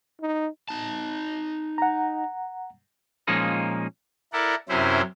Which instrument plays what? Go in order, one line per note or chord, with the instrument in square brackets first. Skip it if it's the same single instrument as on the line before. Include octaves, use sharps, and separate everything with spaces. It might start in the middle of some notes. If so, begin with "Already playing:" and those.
[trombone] D#4
[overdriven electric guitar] D#4 A5
[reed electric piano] F#5 A#5
[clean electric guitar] A#2 F3 G#3 A#3 C#4 D#4
[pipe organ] E4 A4 A#4 D5 F#5
F#2 C3 C#4 E4 C5